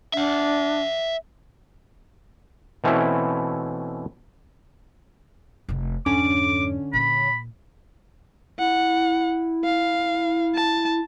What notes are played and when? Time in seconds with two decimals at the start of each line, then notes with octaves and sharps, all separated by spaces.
0.14 D4 E5 F#5
2.84 B2 E3 A3 C4 C#4 E4
5.69 F1 C3
6.06 F2 G#2 D3 C#4 D6
6.93 A#2 D#4 B5
8.59 E4 F#5
9.64 F5
10.55 A5